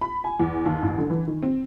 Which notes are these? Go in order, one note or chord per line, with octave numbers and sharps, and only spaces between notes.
B5
G#5
E2
D#2
A1
D3
E3
D#3
C4